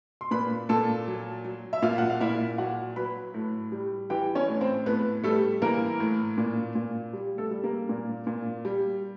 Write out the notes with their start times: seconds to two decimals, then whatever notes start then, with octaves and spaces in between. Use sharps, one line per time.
0.21 C6
0.31 A#2 B4 B5
0.69 A#2 A4 A5
1.08 F#3
1.45 F#3
1.73 E5
1.82 A#2 F4 F5
1.98 F#5
2.10 F5
2.20 A#2 E4 E5
2.58 F#3 F#4 F#5
2.96 F#3 B4 B5
3.34 A2
3.72 G3
4.10 E3 G4 G5
4.35 C#4 C#5
4.48 A2
4.61 C4 C5
4.86 A2 B3 B4
5.23 G3 A3 A4
5.62 E3 A#3 A#4
6.00 A2
6.38 A#2
6.75 A#2
7.13 G3
7.38 A3 A4
7.51 G3
7.64 A#3 A#4
7.89 A#2
8.27 A#2
8.65 G3